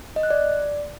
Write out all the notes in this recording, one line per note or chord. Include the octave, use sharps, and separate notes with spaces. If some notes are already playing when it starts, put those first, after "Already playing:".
D#5
F#6
D5